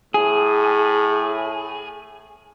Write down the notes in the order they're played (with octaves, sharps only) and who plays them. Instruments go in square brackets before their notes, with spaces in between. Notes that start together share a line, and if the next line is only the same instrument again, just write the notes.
[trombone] A2 [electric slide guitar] G#4